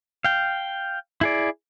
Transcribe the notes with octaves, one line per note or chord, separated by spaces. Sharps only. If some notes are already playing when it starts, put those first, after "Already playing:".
F5 G5
E4 G#4 D5